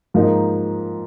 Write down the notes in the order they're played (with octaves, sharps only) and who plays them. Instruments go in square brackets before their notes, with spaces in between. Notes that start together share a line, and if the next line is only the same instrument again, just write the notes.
[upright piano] G#2 F3 A#3 D#4